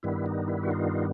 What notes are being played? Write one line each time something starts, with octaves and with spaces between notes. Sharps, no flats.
G2 D#3 G3 B3 E4
D#4
E4
F#4
D#4 F4